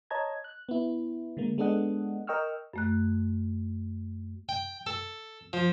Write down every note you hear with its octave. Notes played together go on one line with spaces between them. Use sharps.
C#5 D#5 A5 A#5 G#6
F#6
B3 E4
D3 G#3 A#3
G#3 B3 D4 A4 D#5 F#5
A#4 D#5 G5 C#6 E6 F6
F#2 A3 F#6
G5
A4
F3